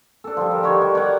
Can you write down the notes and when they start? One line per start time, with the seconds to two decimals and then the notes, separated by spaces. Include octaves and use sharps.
0.24 D4 A4
0.37 F3 G3
0.51 A#4
0.63 G3 D#4 F#4 C#5
0.82 G3
0.95 C#5 D5 F#5 G5